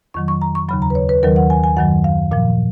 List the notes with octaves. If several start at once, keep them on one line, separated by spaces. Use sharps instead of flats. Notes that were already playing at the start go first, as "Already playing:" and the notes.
F2 D#3 F#3 C#6
C#6
A#5
C#6
D#2 C#3 F#3 B5
A#5
B4
C#5
B4
D#2 D#3 F#3 A#4
F#5
G#5
G#5
F#2 D#3 F#3 F#5
F5
A#2 F3 F5